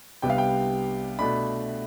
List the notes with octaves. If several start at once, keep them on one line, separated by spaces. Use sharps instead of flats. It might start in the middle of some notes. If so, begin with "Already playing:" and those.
C2 C3 G3 B3 D4 G5
F5
G5
B2 A3 D4 B5